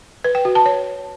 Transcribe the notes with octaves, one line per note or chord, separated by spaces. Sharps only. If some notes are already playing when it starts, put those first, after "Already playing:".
B4
G5
F#4
A5
C#5